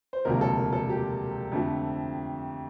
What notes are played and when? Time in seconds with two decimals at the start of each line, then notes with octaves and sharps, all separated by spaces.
0.13 C5
0.25 E1 D2 C3 F3 A#3 A#4
0.41 A4
0.57 A#4
0.73 A4
0.89 G4
1.52 F2 D3 F3 A3